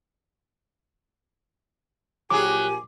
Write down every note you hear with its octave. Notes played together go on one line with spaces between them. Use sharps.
A#1 F#3 G4 G#4 G#5 D6